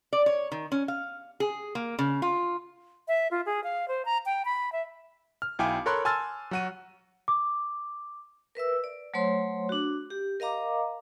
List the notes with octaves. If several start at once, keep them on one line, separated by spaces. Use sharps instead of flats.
D5
C#5
D#3
C#4
F5
G#4
A#3
C#3
F4
E5
F4
G#4
F5
C5
A#5
G5
B5
E5
F6
B1 E4 F5 G5 G#5 D6
A4 A#4 C#5 B5 C6 F#6
G#5 A5 C6 E6 F6 A6
F#3 F#4 D#7
D6
A#4 B4 E5 E6
D5
F#3 A3 C5 C#5 C6
D4 F#4
G4
A#4 D#5 F5 A#5 D6